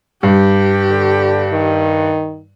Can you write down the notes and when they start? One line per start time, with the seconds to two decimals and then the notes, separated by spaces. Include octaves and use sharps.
0.23 G2 G4
0.90 D3
1.53 D#3